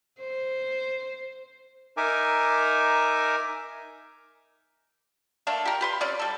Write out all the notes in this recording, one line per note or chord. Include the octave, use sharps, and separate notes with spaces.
C5
D#4 A#4 E5 G#5 D6
A3 A#3 D4
G4 A#4
G4 B4 C6
C3 C#4 D5
G3 A4